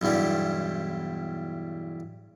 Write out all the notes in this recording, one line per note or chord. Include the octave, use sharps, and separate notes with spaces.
B1 E2 G2 E3 G3